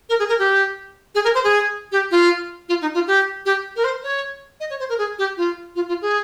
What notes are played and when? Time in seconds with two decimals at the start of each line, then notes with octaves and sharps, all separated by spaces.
0.09 A#4
0.19 G#4
0.29 A#4
0.39 G4
1.15 G#4
1.24 A#4
1.34 C5
1.44 G#4
1.92 G4
2.11 F4
2.69 F4
2.82 D#4
2.94 F4
3.07 G4
3.46 G4
3.76 A#4
3.84 C5
4.04 C#5
4.60 D#5
4.70 C#5
4.80 C5
4.89 A#4
4.98 G#4
5.19 G4
5.37 F4
5.76 F4
5.88 F4
6.02 G#4